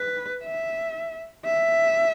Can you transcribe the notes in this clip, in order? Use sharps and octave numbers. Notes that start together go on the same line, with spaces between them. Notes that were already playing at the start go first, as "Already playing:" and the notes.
Already playing: B4
E5
E5